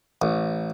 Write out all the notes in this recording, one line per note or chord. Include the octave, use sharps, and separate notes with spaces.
A1